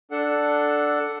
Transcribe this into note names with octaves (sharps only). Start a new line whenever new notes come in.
D4 A4 F#5